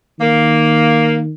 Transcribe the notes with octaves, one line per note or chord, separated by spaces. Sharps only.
D#3 A#3